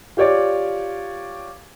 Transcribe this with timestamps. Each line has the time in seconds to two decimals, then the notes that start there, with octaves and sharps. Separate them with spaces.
0.17 F4 G4 C#5 D5